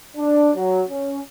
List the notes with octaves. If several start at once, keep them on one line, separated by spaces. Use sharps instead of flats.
D4
F#3
C#4